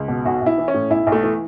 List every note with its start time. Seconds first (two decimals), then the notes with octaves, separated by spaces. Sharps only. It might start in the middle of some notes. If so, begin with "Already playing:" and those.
Already playing: C#2
0.08 B2
0.25 B1 F#4
0.41 B1 E4
0.58 E3
0.68 C#4
0.74 A2
0.90 B1 E4
1.07 B1
1.12 A3
1.23 E3